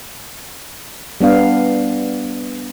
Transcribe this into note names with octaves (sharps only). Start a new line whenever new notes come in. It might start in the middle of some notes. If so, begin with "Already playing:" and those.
G3 B3 D4 F5